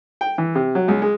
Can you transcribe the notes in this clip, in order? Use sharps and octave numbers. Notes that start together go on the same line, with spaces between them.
G5
E3
C3
F#3
C#2
G#3